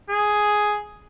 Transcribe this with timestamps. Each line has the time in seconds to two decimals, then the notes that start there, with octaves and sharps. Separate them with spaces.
0.10 G#4